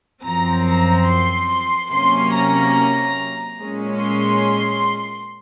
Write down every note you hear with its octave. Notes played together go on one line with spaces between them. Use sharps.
F#2 F3 C4 A#5
A#5
C6
C3 F#3 A#3 C#4 C6
A#5
A#2 G#3 C#4
C6